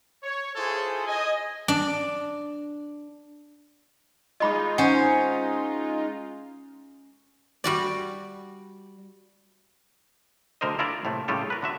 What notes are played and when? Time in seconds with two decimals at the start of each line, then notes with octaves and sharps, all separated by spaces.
0.23 C#5
0.56 E4 F4 G#4 A4 C5 C#5
1.07 D#5 G#5
1.68 D4
4.40 G#3 D#4 F4 D#5 B5 D6
4.78 C#4 C5 F#5
7.64 G3 F#4 D5
10.61 D2 D3 A#4 C5 D#5
10.79 E4 F4 A#4 D5 E5
11.05 A2 C3 A3
11.28 A2 C#3 G3 F4 G4 A4
11.50 A#4 B4
11.62 D3 F#4 E5